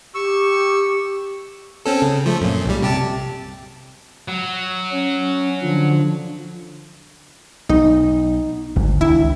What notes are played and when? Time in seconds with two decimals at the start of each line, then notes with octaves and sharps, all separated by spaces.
0.15 G4 C#6 E6
1.86 C4 C#4 A4
2.02 C#3
2.26 F3 A3
2.41 F#2 A#2
2.66 B1 G3
2.83 C3 G4 A5
4.28 F#3
4.91 C#4
5.63 D3 F3
7.69 B1 D#4
8.76 G#1 D2
9.01 C#2 D#3 D4 E4